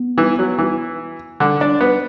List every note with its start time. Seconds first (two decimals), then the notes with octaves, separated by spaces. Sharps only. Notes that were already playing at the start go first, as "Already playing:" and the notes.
Already playing: B3
0.18 E3
0.39 F#3
0.58 E3
1.40 D3
1.61 D4
1.81 B3